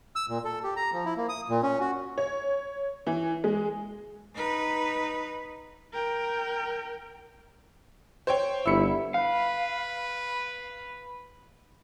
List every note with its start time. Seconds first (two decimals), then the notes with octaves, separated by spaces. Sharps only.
0.16 E6
0.29 A#2
0.45 A4
0.63 G4
0.76 A#5
0.93 F3
1.05 E4
1.17 A#3
1.29 D#6
1.49 A#2
1.63 C#4
1.80 F#4
2.18 C#5
3.07 E3
3.44 G#3
4.35 D#4 B4
5.93 A#4 G5
8.27 C5 C#5 G5
8.66 G1 E4 E6 C#7
9.14 B4 F5